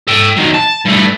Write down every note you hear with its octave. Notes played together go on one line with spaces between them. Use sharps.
A4 G5
D#3 F#3
A5
G2 A3